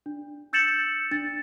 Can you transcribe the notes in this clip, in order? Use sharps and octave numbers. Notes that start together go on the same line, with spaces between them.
D4
E6 G6 A6 C#7 E7 F#7
D4 A6